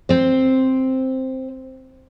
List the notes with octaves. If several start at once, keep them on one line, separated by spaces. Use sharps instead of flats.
C4 C5